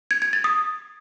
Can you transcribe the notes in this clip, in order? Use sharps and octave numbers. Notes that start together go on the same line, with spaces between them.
G#6
G#6
A6
D#6